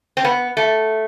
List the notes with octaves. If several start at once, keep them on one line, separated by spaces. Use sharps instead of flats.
C4
B3
A3